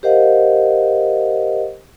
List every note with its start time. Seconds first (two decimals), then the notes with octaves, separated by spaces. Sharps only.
0.03 G4 A#4 C5 D#5 F5 F#5